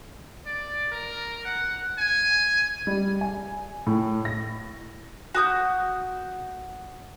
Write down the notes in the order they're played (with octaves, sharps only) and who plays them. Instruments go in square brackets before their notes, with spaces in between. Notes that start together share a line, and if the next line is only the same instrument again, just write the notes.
[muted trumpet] D5
A#4
F#5
G#5
[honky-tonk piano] G3
G#5
A2
A#6
[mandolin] F#4 D#6 G6